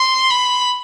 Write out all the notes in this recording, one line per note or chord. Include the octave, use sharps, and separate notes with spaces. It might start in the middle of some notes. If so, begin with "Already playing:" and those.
Already playing: C6
B5